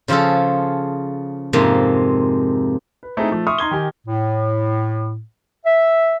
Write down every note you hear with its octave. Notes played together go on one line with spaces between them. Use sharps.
C#3 F3 F4 G#4 A4
F2 G#2 C3 A#3
B4
A3 C4 D#4 E4 G#4
F3 A3
E5 C6 C#6 D#6 F6
D#4 C6 G#6 G7
D#3 G4 G#5
A2
E5